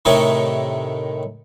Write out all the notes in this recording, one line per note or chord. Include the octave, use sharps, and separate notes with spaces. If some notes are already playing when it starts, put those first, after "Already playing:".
A2 C3 D#3 D#4 C#5